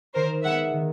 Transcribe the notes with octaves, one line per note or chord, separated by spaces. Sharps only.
D#3 A#4 C5
G#3 B3 E5 F#5
D#3